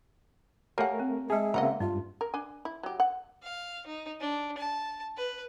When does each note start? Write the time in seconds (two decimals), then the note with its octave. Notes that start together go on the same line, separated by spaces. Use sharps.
0.78 A3 G4 A#4 C#5 F5 F#5 G#5
1.00 C4
1.30 G#3 G#4 E5 A5
1.54 C#3 A#3 C4 D#5 F#5 A#5
1.80 G2 D4 F4
2.21 A#4
2.34 D4 G#5
2.65 E4
2.83 F#3 G4
3.00 F#5
3.43 F5
3.86 D#4
4.20 D4
4.58 A5
5.17 B4